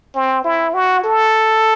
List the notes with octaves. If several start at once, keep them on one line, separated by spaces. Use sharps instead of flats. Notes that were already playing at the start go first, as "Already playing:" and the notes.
C4
E4
F#4
A4